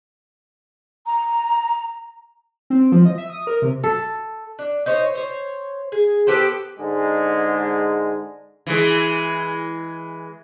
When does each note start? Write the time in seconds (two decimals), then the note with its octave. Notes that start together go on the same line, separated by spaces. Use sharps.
1.06 A#5
2.70 C4
2.92 F3
3.05 D#5
3.18 E5
3.30 D#6
3.47 A#4
3.62 C3
3.84 A4
4.59 D4
4.86 D#4 C5 C#5
5.15 C5 C#5
5.92 G#4
6.27 B3 G4 A4 C5
6.78 G#2 D3 G#3
8.66 E3 G#3